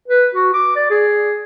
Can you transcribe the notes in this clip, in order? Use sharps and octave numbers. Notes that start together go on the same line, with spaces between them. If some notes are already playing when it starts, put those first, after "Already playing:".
B4
F#4
D6
D5
G#4